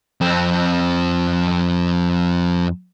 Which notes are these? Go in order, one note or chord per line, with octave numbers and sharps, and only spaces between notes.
F2 C4